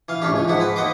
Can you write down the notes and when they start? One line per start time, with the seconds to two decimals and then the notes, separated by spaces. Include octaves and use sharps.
0.09 E3 F5
0.22 A2 C#4 D4 G4
0.33 C#2 E3
0.48 G#2 F3 E4 F#5
0.60 C4 B4
0.76 D#2 B4 D#5 F#5 C6 D6